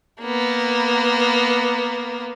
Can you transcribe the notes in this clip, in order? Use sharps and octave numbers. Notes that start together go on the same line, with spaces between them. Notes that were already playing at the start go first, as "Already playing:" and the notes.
A#3 B3